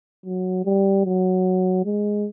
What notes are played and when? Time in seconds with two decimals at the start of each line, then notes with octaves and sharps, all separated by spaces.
0.26 F#3
0.65 G3
1.05 F#3
1.85 G#3